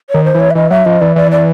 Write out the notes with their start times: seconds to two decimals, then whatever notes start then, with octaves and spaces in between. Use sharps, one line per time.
0.10 D#3 C#5
0.24 C5
0.35 E3
0.40 C#5
0.51 E5
0.55 E3 D#5
0.71 F#3 E5
0.85 F3 D#5
1.01 E3 D5
1.16 E3 D5
1.31 D5